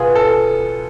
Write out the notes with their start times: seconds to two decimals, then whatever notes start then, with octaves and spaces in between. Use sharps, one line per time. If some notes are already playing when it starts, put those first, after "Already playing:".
Already playing: B2 B3 F4 G#4
0.15 A4